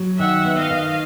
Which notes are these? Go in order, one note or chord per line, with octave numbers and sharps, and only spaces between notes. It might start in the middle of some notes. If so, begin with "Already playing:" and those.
Already playing: F#3
D#3 E5 F#5
B3
D#5 F5
D#3